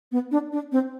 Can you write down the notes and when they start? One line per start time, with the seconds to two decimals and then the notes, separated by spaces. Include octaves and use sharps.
0.12 B3
0.31 D4
0.52 D4
0.72 C4